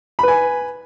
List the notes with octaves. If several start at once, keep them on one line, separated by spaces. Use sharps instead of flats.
B4 G#5 B5